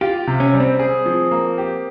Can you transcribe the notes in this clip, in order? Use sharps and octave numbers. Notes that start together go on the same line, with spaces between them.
F4 G4
C3
C#4
G3
C4
G#4
F3
A#3
G4